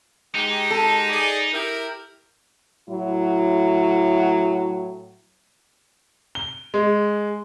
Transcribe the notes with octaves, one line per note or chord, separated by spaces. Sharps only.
G#3 D#4 G4
A4
G#4 D5
E4 G4 A#4
A2 F#3 E4
G7
G#3